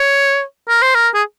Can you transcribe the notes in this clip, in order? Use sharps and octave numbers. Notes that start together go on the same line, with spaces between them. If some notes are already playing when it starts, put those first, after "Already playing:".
Already playing: C#5
A#4
C5
A#4
G#4